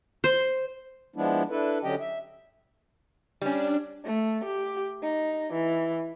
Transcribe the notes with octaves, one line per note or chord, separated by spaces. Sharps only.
C5
F3 G#3 B3 D4 E4
D4 E4 A4 B4
D3 F#3 C#4 G4 D#5 G5
E5
G3 C#4 D4
A3
G4
D#4
E3